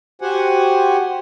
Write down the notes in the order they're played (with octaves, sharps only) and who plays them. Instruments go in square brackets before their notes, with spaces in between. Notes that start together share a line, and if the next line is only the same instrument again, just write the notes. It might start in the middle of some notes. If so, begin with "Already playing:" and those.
[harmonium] F#4 G4 C5 F#5 G#5